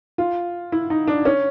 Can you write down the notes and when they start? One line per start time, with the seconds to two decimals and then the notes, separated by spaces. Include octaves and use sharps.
0.18 F4
0.72 E4
0.90 D#4
1.08 D4
1.25 C#4